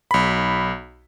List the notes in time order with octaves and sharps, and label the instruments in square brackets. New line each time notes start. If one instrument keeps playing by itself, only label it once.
[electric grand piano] B1 B5